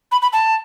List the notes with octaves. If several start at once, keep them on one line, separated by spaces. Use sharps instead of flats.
B5
B5
A5